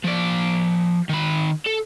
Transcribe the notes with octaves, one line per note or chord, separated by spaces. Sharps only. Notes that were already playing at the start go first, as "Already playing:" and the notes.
F3 D5
D#3 B5
A4